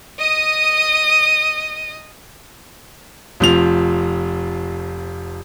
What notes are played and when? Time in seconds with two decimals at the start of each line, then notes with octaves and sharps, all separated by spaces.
0.19 D#5 D#6
3.40 F1 F3 F7